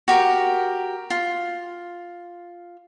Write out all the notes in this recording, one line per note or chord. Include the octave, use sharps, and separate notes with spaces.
F#4 G4 A#4
F4